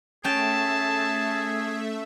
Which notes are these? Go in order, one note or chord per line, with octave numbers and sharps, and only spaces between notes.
A3 C#4 G#4 E5 G5 A5